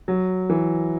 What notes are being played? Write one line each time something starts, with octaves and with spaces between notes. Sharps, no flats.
F#3
E3